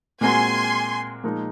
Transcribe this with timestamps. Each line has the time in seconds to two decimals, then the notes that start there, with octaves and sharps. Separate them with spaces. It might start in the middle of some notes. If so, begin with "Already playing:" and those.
0.21 A#2 G#3 C4 F#4 A#4 G#5 C6
1.24 A#2 F3 G#3 D#4 A#4